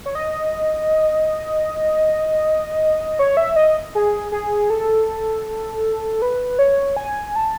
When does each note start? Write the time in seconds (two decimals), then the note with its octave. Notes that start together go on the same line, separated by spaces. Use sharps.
0.06 C#5
0.15 D#5
3.19 C#5
3.37 E5
3.56 D#5
3.95 G#4
4.32 G#4
4.70 A4
6.22 B4
6.59 C#5
6.97 G#5
7.36 A5